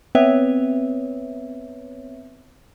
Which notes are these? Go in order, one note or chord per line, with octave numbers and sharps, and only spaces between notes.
B3 C4 B4 C#5 E5